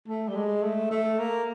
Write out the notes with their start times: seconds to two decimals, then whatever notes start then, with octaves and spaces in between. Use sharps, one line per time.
0.08 A3
0.28 G3
0.36 G#3
0.63 A3
0.91 A3
1.19 A#3